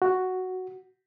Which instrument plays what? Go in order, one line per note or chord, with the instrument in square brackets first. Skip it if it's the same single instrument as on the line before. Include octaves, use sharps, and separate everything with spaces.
[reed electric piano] F#4